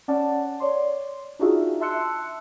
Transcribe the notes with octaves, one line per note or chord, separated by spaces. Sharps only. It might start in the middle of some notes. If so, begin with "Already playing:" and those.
C#4 D5 F#5 A5
C#5 D5 C6
D4 D#4 F4 F#4 G#4 E5
E5 A5 C6 E6 F#6 C#7